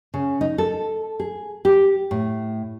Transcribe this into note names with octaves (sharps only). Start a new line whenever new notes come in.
C#3
D#4
A4
G#4
G4
A2